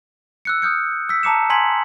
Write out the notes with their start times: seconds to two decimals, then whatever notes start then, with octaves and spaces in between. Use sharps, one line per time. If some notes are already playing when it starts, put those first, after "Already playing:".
0.45 E6 F#6 C#7
0.62 D#6 F6 G6 C#7
1.09 E6 B6
1.23 A5 A#5 D6 C#7 E7
1.50 G#5 A#5 C6 G#6 B6 F#7